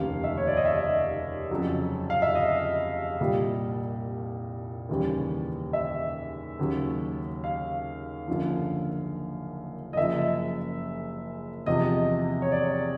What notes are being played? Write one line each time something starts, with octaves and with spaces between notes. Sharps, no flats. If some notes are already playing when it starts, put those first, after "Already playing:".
Already playing: F1 D#2 C#3 F5
E5
C#5
D5
D#5
E5
F2 C#3 F#3
F5
E5
D#5
C2 A#2 G3
D#2 C#3 E3 G3
E5
D#2 C#3 F#3
F5
F#1 F#2 D3 F3
D#5
F#1 F#2 C#3 F3 E5
E2 C3 F3 D#5
C#5
D5